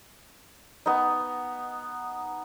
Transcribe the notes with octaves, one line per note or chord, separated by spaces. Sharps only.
B3 D#4